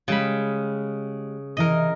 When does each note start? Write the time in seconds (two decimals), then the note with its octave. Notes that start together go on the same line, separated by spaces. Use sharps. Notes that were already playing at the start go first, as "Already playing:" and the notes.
0.08 C#3 G3 G#3 G4 B5
1.57 C3 E3 A#4 D#5